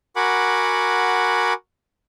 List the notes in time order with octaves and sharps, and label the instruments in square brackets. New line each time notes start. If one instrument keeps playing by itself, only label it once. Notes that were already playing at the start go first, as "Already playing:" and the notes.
[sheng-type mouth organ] F#4 A#4 F#5 G#5 B5 D6